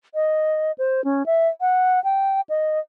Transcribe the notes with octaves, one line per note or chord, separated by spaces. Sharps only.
D#5
C5
C#4
E5
F#5
G5
D#5